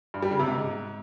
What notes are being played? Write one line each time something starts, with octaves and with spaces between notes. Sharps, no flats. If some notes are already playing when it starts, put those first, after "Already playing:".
G2
G3
C#3
C3
G#2